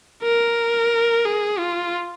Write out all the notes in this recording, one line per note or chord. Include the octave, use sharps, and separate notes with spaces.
A#4
G#4
F4